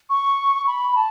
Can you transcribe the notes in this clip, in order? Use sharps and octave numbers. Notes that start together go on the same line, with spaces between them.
C#6
B5
A5